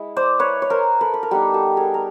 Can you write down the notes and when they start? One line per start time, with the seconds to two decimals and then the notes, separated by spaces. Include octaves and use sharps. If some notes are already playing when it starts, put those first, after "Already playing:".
Already playing: G#3 E4
0.16 C5 D5
0.39 B4 C#5
0.62 C#5
0.70 A#4 C5
1.01 A4 B4
1.14 B4
1.23 A#4
1.31 G3 B3 D#4 G4 A4
1.54 G4 A4
1.77 G#4 A#4
1.94 A#4